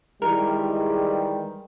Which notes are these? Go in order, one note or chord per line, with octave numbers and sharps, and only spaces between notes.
D#3 E3 G3 G#3 A#4